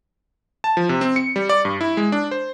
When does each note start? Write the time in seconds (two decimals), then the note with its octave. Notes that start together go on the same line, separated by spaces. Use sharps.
0.64 A5
0.77 F3
0.89 C3
1.01 C4
1.16 C#7
1.36 G3
1.49 D5
1.65 G2
1.81 E4
1.97 G#3
2.12 D4
2.31 C5